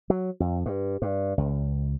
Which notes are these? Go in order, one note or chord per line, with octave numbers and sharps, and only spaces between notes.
F#3
F2
G2
G2
C#2